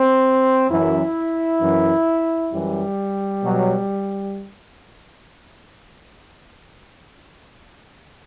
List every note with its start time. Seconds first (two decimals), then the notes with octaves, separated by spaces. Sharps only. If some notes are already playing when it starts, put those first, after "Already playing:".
Already playing: C4
0.70 F#2 E3 E4
1.61 F#2 E3
2.52 F#2 E3 G3
3.43 B2 F#3